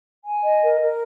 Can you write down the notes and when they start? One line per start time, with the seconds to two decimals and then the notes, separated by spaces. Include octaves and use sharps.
0.25 G#5
0.43 D#5
0.62 A#4
0.80 A#4